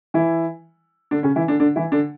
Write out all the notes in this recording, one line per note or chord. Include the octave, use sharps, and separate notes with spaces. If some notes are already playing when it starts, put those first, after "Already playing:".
E3 E4
D3 D4
C#3 C#4
E3 E4
D3 D4
D3 D4
E3 E4
D3 D4